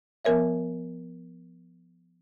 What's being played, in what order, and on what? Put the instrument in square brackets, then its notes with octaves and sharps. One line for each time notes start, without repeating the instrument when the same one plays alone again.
[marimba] F3 B3 A#4 C#5 E5